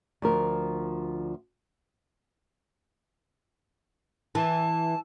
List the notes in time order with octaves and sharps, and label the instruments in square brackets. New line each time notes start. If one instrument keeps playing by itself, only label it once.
[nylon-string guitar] D2 F3 A#4
[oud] E3 [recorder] A5